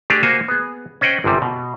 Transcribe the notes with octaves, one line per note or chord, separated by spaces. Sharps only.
A3 D4 G4 G#4
A#3 F#4 C5 F5 G#5 A#5
B3 G#4
C#4 C5 D#5 F#5 G5
G1 F#2 C3 G3
B2